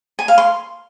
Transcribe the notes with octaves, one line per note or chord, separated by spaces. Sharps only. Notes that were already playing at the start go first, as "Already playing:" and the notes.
G#5
F5
C6